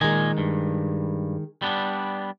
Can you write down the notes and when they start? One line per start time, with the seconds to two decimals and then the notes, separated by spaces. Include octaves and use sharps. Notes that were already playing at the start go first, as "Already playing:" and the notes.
0.01 A#2 D#3 G#3 D#5 G#5
0.38 G2
1.62 G3 B3 D4